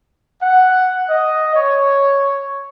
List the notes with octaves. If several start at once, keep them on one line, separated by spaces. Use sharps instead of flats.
F#5
D#5
C#5